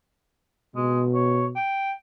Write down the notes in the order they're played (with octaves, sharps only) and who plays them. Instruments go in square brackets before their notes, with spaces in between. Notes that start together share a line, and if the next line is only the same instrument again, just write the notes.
[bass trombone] B2 [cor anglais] G#3
[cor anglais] C#5
G5